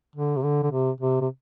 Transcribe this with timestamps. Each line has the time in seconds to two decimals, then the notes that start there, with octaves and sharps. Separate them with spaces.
0.16 D3
0.36 C3
0.44 D3
0.63 D3
0.71 C3
1.00 C3
1.21 C3